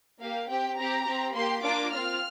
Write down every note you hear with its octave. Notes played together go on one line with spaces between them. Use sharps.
A#3 G4 F5
C4 G4 G5
C4 G4 A#5
C4 G4
A#3 G4 C6
A#3 D4 F4 D6
C4 F4 F6